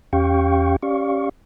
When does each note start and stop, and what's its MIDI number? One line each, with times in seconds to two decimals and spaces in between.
0.13 0.76 40
0.13 0.76 61
0.13 0.76 67
0.13 0.76 77
0.13 0.76 79
0.13 0.76 85
0.82 1.29 61
0.82 1.29 67
0.82 1.29 74
0.82 1.29 77
0.82 1.29 85